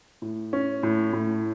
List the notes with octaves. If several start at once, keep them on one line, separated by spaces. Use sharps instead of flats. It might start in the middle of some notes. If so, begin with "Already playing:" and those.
A2
C#4
A2
A2